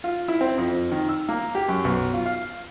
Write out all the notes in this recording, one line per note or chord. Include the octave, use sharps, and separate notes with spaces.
F4
E4
C4
F2
D#3
E6
A#3
G4
F#2
B1
F4
F5